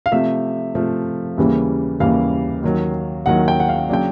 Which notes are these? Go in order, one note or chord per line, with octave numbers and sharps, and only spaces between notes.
F5
C3 F3 A3 E5
C3 F3 A3
D#2 C#3 E3 G3 A#3
D#2 C#3 E3 G3 A#3 F5
D#2 D#3 F#3
D#2 D#3 F#3 F#5
G5
F#5
F5
C#3 F#3 A#3 D4 G5